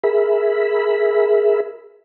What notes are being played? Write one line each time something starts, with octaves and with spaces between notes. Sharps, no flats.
G#4 A#4 E5 B5